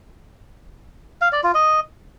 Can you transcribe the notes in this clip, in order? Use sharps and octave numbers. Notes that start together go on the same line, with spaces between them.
F5
D5
F4
D#5